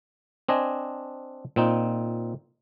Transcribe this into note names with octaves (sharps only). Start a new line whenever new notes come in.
C4 D4 D#5 G#5
A#2 C4 D#4